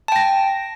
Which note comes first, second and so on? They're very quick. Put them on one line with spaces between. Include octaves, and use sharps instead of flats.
A5 G5 A#6